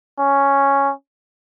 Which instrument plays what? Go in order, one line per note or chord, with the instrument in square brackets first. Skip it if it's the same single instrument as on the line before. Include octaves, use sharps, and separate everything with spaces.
[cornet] C#4